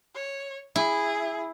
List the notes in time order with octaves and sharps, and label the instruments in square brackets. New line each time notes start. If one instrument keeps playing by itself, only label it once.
[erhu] C#5
[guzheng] E4 [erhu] G#4